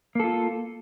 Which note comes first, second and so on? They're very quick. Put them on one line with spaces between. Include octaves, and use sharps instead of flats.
A#3 A4 F4